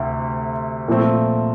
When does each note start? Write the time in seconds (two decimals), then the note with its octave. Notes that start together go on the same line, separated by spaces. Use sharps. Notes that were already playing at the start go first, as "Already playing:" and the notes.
Already playing: D2 C3
0.88 A#2 F3 A3 C4